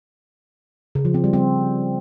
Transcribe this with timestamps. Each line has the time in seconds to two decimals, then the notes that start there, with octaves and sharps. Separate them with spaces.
0.95 C#3
1.05 F3
1.14 C4
1.24 G3
1.33 C4